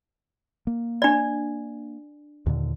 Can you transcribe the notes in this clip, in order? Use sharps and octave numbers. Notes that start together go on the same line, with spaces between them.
A#3
D4 D5
D#2 A#2 D3